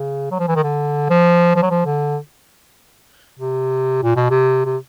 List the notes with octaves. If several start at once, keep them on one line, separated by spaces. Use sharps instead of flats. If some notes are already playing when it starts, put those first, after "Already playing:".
Already playing: C#3
F#3
F3
E3
D#3
D3
F3
F3
F#3
F3
D3
C3
A#2
B2
C3
C3